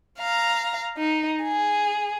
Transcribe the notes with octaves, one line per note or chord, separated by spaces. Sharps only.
F5 A#5
D#4
G#4